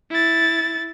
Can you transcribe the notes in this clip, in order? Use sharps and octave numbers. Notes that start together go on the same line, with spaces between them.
E4 A6